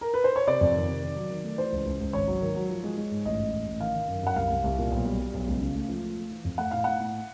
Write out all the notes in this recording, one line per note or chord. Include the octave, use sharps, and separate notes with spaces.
A#4
B4
C5
C#5
C3 D5
F2
D#3
C3
D#3
F#3
D#3
A3
E3 C5
C#2
C#2
C#2
G#1 C#5
F#3
D#3
F#3
F3
G#3
G#3
G#2
A1 D#5
A1
A1
A1
D#3 F5
D#3
F#2
F#2 F#5
C2 F5
C2
C2
A#2
B1
G3
G3
B1
C#2
C#3
A3
F3
A3
A3
E3
F2
A3 F#5
A2 F5
A2 F#5
A2